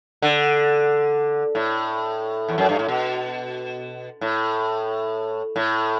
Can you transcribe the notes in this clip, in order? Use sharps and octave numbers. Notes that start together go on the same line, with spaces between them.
D3
A2
E2
F#2
G2
A2
B2
A2
A2